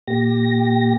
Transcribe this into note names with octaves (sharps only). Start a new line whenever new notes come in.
A#2 G4 A#6